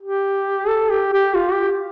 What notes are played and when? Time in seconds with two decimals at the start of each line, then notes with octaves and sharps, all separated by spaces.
0.02 G4
0.68 A4
0.90 G4
1.13 G4
1.34 F4
1.52 G4